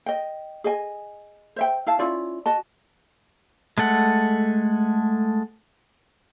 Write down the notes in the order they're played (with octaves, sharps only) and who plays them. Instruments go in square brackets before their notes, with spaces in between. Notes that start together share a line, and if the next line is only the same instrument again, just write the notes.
[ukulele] D#5 G5
G#4 D#5 G#5
C5 E5 G5
E4 F5 A5
C#4 E4 F4 D5
F#4 D#5 A5
[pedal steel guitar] G#3 A3 A4 F#5